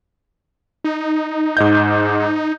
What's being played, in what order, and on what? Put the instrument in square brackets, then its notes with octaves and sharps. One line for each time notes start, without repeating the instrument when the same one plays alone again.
[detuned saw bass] D#4
[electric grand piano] G#2 D#5 G6